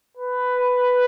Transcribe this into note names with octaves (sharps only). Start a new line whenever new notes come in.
B4